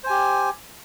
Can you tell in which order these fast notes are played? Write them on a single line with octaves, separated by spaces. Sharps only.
C5 G#5 G4